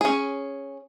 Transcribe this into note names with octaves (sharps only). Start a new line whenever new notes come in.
C#4 G#4